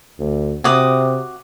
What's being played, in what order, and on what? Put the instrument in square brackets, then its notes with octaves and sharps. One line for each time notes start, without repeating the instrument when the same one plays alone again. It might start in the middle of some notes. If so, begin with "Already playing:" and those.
[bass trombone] D2
[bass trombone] C3 [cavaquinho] F#4 D6 D#6